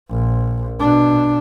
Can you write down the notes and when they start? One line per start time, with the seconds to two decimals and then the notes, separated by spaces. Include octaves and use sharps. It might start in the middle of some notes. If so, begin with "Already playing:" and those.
0.10 A#1
0.80 B2 D4